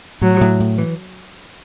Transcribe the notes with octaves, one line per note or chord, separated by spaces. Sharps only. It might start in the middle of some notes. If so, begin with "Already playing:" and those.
A2 F#3
A2
A2
E3